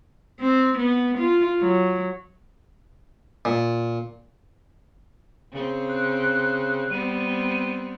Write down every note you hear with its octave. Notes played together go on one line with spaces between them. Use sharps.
C4
B3
F4
F#3
A#2
C#3 C4
F#6
G3 B3 C4 D#7